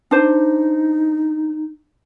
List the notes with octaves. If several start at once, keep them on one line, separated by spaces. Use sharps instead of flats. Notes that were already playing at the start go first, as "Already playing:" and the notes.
D4 D#4 C5